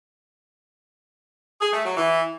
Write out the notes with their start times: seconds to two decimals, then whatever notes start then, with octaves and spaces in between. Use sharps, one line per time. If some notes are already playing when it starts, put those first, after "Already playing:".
1.61 G#4
1.73 A3
1.85 F#3
1.97 E3